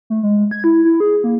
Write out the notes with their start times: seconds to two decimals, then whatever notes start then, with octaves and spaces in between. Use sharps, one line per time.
0.10 A3
0.23 G#3
0.51 G#6
0.64 E4
0.85 E4
1.00 G#4
1.24 A#3